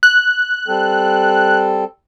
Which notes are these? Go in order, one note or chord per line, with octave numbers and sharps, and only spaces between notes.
F#6
G3 C4 A4